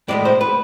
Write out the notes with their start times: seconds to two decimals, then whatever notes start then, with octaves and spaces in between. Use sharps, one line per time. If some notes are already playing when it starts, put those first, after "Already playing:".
0.08 A2 G#3 B3 D5
0.25 C5
0.41 B4